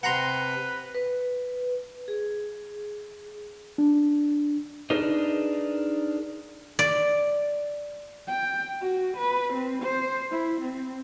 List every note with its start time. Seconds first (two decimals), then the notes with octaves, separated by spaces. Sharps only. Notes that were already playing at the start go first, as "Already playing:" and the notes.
0.03 C3 B4 F#5 A#5 C6
0.95 B4
2.08 G#4
3.78 D4
4.90 D4 D#4 G#4 A#4 B4 D#5
6.79 D5
8.27 G5
8.82 F#4
9.17 B4
9.53 C4
9.82 C5
10.31 E4
10.60 C4